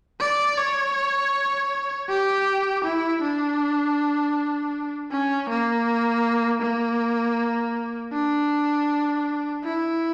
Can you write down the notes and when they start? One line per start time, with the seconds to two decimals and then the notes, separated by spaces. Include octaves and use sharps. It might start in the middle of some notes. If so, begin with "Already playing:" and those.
0.20 D5
0.58 C#5
2.09 G4
2.84 E4
3.22 D4
5.11 C#4
5.49 A#3
6.62 A#3
8.13 D4
9.64 E4